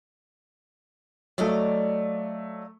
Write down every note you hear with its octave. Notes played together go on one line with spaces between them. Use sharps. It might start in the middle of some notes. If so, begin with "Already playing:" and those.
F#3 A3 D5 D#5 F5